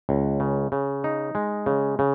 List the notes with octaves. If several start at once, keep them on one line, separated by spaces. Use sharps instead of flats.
C#2
C#3
C#3
D#4
G#3
C#3
C#3